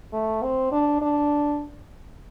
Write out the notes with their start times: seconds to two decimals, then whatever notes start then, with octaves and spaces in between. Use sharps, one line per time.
0.13 A3
0.43 C4
0.72 D4
1.02 D4